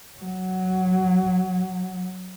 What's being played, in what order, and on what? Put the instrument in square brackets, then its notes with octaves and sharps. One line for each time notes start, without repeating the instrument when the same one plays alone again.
[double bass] F#3